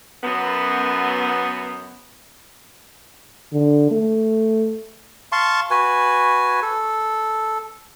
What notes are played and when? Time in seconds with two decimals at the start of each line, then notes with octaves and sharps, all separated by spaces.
0.24 F#2 B3
3.53 D3
3.91 A3
5.32 F5 A5 C6 C#6
5.71 F#4 B4 G#5
6.62 A4